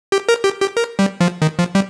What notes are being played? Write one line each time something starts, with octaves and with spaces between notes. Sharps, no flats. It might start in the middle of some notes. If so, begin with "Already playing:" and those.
G4
A#4
G4
G4
A#4
G3
F3
D#3
F3
G3